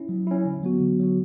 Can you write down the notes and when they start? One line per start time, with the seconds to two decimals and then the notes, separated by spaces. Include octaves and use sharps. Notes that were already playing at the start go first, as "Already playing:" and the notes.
Already playing: C#4 E4
0.09 F#3
0.27 C#4 E4
0.45 D3
0.63 F#3 B3 F#4
0.80 D3
0.99 F#3 B3 F#4